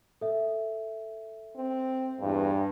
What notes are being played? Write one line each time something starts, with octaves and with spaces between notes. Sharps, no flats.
A4 E5
C4
E2 G2